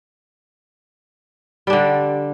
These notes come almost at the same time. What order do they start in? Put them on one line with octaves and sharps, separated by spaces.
G3 D4 D3